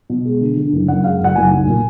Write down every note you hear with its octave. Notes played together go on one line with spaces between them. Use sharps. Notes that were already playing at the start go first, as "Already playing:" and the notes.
B2
G#3
D3
D3
F#1
F#2 F#5
G#3 F5
F#1 F#5
F#1 G#5
B1
A#2